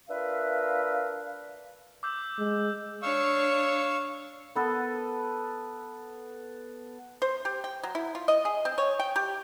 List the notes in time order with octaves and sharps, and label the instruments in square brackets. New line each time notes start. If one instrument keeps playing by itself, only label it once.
[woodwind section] D4 F4 A#4 B4 E5 F5
[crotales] D6 E6 G6
[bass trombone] G#3
[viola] D4 C#5 [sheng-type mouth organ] F5 C#6 E6
[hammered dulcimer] B3 A4 B4
[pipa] C5
G4
G5
F#3
E4
F4
D#5
G#4
C4
C#5
G5
G4